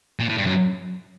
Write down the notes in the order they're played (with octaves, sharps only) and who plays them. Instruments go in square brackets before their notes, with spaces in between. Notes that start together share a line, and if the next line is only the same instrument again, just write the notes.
[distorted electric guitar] A#2
A2
G2
F#2